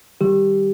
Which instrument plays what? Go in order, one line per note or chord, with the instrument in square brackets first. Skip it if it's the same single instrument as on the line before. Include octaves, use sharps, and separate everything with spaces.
[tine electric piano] D#3 G3 G4